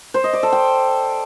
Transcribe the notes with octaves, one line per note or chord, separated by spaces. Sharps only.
C5
D#5
D5
A4
G5